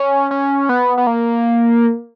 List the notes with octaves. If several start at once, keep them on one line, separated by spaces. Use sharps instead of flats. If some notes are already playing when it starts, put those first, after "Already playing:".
Already playing: C#4
C#4
B3
B3
A#3